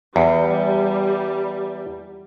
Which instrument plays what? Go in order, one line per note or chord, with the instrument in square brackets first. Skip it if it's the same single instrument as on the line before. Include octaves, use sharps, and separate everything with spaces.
[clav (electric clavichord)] E2 [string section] G3